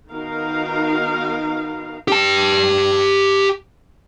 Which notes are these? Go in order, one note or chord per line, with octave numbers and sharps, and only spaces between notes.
D#3 B3 D#4 F#4 A#4 F5
G4 A5